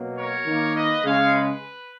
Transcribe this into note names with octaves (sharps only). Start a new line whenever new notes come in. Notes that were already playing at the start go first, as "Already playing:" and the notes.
Already playing: B2 F#3 A#3
A#4 C#5
D#3 A#3
B4 D#5
C#3 G#3 C#5 F5
B4